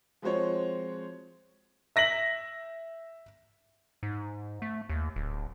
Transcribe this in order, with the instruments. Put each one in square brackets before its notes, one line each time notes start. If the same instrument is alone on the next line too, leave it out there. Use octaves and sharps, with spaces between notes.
[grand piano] F3 G#3 C4 F#4 C5 C#5
E5 A#6 B6 F#7
[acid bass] G#2
A3
D#2
D1